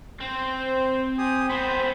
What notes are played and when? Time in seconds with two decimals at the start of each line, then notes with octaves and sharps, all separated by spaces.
0.20 C4 C5
1.18 G4 G#5 D#6
1.50 B3 C4 C5